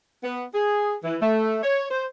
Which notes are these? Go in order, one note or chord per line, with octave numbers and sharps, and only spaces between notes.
B3
G#4
E3
A3
C#5
C5